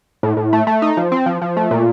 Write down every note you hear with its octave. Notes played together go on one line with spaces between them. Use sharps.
A2
A2
A3
A3
D#4
F3
C4
F3
F3
A3
A#2